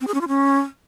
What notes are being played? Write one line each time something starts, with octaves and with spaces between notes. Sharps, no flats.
C4
G#4
C#4
F4
C#4